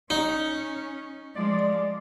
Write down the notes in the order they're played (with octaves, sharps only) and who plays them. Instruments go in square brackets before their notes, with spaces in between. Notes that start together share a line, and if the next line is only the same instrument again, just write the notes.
[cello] C#4 [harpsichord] D#4
[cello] F3 G#3 [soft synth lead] D5